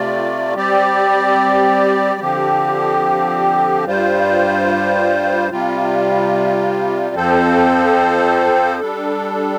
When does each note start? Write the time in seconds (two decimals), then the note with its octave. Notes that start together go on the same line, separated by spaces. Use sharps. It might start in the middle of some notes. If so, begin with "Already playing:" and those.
Already playing: C3 A3 F4 D5
0.55 G3 C4 G4 D5
2.20 D3 F3 C4 G4
3.84 G2 G3 F4 C5
5.50 C3 G3 F4
7.15 F2 F3 C4 A4 C5
8.80 G3 D4 A4